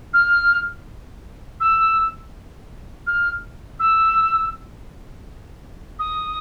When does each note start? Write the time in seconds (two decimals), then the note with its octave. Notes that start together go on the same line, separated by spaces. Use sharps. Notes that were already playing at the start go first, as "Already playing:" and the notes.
0.13 F6
1.60 E6
3.07 F6
3.79 E6
5.99 D#6